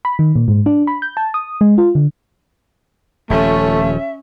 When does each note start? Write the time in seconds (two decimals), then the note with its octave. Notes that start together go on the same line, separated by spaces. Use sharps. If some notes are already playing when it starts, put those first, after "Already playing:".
0.05 B5
0.19 D#3
0.36 A#2
0.48 G#2
0.66 D4
0.87 B5
1.02 G6
1.17 A5
1.34 D#6
1.61 G#3
1.78 F4
1.95 D3
3.30 D#1 F3 A3 C#4 E5